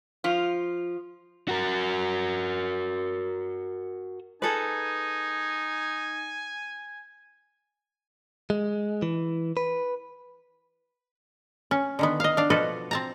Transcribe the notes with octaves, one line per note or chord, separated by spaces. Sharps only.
F3 F4
F#4 A#4
D#4 G#4 A4 B4 G#5
G#3
E3
B4
C#4
D3 D#3 B3
D#5 F5
D4 F5
B2 F3 F#4 A4 B4
C4 A5 A#5